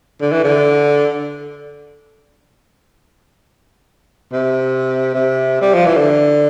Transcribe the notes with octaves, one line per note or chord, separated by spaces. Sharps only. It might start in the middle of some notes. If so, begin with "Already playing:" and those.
D3
E3
D3
C3
C3
G3
F3
E3
D3